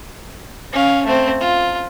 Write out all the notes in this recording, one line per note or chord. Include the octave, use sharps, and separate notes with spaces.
C#4 F5
A3 C4
F4